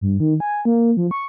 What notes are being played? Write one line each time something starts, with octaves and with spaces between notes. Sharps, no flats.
G2
D#3
G#5
A#3
F3
C#6